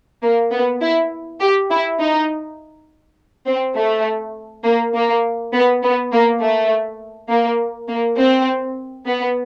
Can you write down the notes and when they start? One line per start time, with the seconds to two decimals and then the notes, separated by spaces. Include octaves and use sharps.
0.23 A#3
0.52 B3
0.82 E4
1.41 G4
1.70 E4
1.99 D#4
3.47 C4
3.76 A3
4.64 A#3
4.94 A#3
5.53 B3
5.83 B3
6.12 A#3
6.41 A3
7.29 A#3
7.89 A#3
8.18 C4
9.06 B3